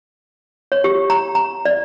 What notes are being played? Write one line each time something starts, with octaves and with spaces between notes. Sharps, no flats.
C#5
G4
A#5
A#5
D5